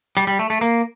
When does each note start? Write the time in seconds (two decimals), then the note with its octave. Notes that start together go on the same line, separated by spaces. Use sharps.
0.17 G3
0.27 G3
0.39 A3
0.50 A3
0.61 A#3